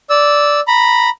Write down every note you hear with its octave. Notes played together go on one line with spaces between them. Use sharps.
D5 E6
A#5 B5